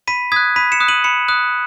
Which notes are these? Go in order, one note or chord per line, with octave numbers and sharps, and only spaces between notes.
B5 B6 D#7
D#6 F#6 G#6 B6
B5 B6 D#7
C#7 E7
D#6 F#6
D#7 F#7
B5 C#7 E7
D#6 F#6